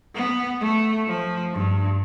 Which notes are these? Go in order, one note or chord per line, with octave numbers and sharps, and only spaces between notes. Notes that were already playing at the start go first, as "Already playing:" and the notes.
B3
A3
F3
G2